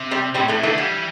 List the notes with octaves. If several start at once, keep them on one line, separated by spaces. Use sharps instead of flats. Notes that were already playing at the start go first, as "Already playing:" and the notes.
Already playing: C3
G3 C4
A2 G3 C4
A2 E3 A3
D3 E3 A3
E3 G3